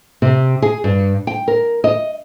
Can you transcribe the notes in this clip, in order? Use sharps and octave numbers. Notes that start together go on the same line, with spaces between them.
C3
G#4
G2
G5
A#4
D#5